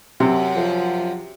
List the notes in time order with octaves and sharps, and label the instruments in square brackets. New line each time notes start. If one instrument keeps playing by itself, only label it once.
[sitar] F#2 [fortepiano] C3
[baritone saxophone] F3